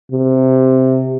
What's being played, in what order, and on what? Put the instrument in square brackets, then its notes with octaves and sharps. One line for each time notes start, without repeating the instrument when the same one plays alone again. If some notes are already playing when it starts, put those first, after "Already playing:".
[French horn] C3